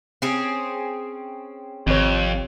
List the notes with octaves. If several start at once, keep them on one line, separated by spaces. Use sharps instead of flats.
C4 C#4 G#4
G#1 F2 C3 C#5